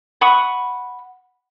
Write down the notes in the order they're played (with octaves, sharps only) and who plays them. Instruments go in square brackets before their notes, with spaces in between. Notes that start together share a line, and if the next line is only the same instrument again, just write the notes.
[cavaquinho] F#5 B5 C#6 D#6